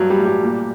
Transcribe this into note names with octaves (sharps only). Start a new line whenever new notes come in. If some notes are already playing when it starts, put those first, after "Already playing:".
Already playing: G2 F#3
G3
A1
G3
A#2